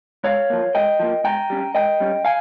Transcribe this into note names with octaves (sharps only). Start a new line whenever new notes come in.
G#2 C#5 F5
F3 A#3
G#2 D#5 G5
F3 A#3
G#2 G5 A#5
G3 C#4
G#2 D#5 G5
G3 C#4
F5 G#5